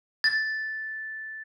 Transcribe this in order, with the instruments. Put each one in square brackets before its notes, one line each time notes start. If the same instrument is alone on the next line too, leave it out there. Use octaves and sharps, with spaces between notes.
[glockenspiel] A6